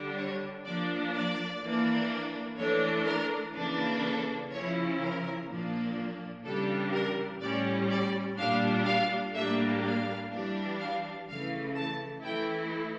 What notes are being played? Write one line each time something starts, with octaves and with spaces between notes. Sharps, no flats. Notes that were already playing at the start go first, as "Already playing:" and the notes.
Already playing: D3 G3 D4
C#5
F3 A#3 D4 D5
D5
E3 A#3 D4
E3 A3 D4 C#5
A#4
C#3 E3 A#3 D4
A4
C#3 F3 C#4 E4 C#5
A#4
A#2 F3 A#3 D4
C#3 E3 G3 D4 A4
A#4
A2 G3 C#4 D5
D5
A#2 G3 D4 F5
F5
A2 G3 A#3 D4 E5
F5
E3 G3 D4
F5
C#3 E3 A3 F5
A5
E3 A3 E4 G5